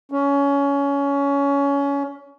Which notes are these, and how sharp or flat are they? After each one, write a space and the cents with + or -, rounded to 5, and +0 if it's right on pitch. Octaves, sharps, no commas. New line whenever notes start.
C#4 +20